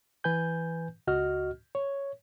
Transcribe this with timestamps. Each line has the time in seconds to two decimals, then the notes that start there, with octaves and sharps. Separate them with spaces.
0.24 E3 B4 G#5 G6
1.07 C#2 F#4 D#5 F6
1.75 C#5